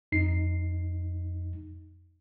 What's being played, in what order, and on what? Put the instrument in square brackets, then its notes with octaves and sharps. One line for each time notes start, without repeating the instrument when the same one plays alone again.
[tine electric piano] F2 D#4 C7